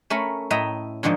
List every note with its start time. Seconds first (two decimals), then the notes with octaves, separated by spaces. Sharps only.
0.10 A3 C#4 A#4 B5
0.50 A2 D#5 E5 G5 A#5
1.03 G#2 D3 D#3 F3 A#3